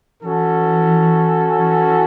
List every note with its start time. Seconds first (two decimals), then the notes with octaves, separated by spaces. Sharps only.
0.22 E3 C#4 F#4 A4
1.57 E3